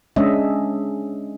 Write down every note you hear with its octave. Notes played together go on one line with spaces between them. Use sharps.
G#3 C#4 D4 D#5 E5